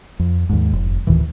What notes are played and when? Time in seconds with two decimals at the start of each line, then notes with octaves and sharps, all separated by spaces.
0.19 F2
0.50 D#2 G#2
0.73 F1
1.07 D2 A2 D#3 E3